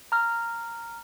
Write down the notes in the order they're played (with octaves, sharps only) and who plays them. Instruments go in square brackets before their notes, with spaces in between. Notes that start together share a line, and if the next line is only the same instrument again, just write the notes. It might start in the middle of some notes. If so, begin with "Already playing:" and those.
[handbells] A#5 F6